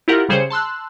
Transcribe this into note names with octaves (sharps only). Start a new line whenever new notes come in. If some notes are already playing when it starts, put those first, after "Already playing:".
E4 F4 G4 A#4 F#5
C#3 G3 G#4 C5 C#7
A5 C6 E6 F#6